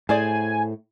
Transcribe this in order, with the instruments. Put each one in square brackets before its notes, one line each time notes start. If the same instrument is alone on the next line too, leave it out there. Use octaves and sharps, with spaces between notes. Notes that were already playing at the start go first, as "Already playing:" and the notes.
[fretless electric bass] A2 [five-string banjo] G#4 C5 D5 [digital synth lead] G#5